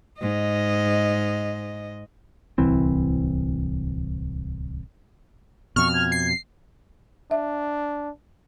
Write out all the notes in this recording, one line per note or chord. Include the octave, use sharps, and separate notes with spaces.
G#2 D#5
D1 C2 E3 C4
F2 B2 C#6 F6
G#6
C7
D4 E5